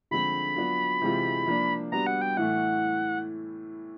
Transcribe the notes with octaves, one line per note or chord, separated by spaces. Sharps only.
D3 F3 G#3 C4 B5
F#3 B3 D4 F4
C3 E3 G#3 C4 F4
F3 A#3 D4
G3 B3 D4 F#4 A#5
F#5
G5
A2 E3 A3 F#5